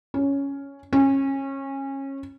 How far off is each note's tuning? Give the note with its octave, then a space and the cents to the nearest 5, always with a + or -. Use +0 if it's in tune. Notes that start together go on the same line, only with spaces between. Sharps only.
C#4 +5
C#4 -25